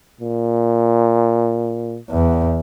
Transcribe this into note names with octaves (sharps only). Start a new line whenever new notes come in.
A#2
E2